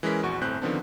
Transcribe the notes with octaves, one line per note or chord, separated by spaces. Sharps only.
E3 G#3 C#4 A#4 B6
A#1 E2 F#4 C#6
G1 A2 C4 F#6 G6
D3 D#3 F3 B3 C4 D4